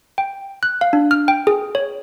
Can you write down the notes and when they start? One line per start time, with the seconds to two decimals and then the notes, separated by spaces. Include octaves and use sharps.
0.18 G5
0.63 F#6
0.81 F5
0.93 D4
1.11 F6
1.28 G5
1.47 G#4
1.75 C#5